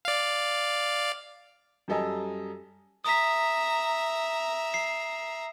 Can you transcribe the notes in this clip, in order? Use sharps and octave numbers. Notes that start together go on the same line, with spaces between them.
D5 F5
F#2 G3 A4 D#5 G#5 A#5
E5 A#5 D#6 B6
C7